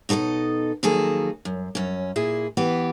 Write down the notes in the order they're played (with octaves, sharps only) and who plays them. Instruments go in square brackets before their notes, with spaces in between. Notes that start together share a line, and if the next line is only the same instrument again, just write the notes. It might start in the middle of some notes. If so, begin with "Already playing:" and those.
[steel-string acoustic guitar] B2 D#4 A4 C#5 D#5
F2 D#3 F#3 A#3 G#4 A4
F#2
F#2 C#4
A#2 E4 G#4
E3 B3 G4